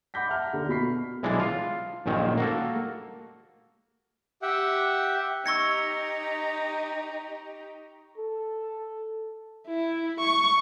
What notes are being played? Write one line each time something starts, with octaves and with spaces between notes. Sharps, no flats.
F#5 B5 D6 G6 A#6 B6
E5 F#5 A5 A#5 F6
D#2 D3
B2 B5 B6 C7
B1 E3 G#3 D4
F4
A#1 F#2 A#2 D#3
A#3 F#4 A4
G4 E5 F#5 G5
D#4 G4 C#6 E6 G#6 A#6 C#7
A4
E4
C#6